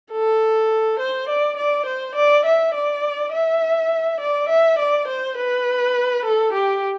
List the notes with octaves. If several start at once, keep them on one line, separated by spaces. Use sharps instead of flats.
A4
C5
D5
D5
C5
D5
E5
D5
E5
D5
E5
D5
C5
B4
A4
G4